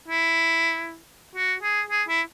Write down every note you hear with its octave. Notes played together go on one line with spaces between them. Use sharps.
E4
F#4
G#4
G#4
E4